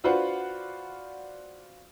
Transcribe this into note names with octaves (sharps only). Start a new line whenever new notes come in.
D4 F4 F#4 B4 C5 F#5